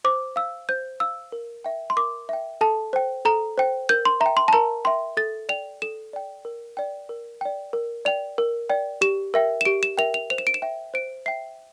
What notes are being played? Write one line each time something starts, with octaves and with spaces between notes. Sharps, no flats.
C5 D6
F5 E6
C5 G6
F5 E6
A#4
E5 G5
C6
A#4 D6
E5 G5
A4 A5
C5 G5
A4 A#5
C5 G5
A#4 G6
C6
E5 A#5
G5
C6
A5
A#4 A#5
E5 G5 C6
A4 A6
D5 G5 F7
A4 E7
D5 G5
A#4
D5 G5
A#4
D5 G5
A#4
D5 G5 F7
A#4
D5 G5
G4 E7
A#4 E5 G5
E7
G4 D7
E7
A#4 E5 G5 F7
F7
C5 F7
E7
D7
E7
E5 G5
C5 D7
E5 G5 C7